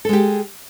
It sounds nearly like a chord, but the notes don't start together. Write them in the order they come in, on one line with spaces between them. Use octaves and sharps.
A4 G#3 G4